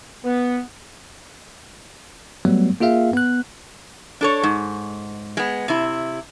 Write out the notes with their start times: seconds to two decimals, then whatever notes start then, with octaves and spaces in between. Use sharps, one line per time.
0.24 B3
2.45 F#3 G3 A3 B3
2.81 A#3 F4 G#4 E5 F5
3.13 B3 F#6
4.21 D4 A4 C#5
4.43 G#2
5.37 G#3 B3
5.68 C3 E4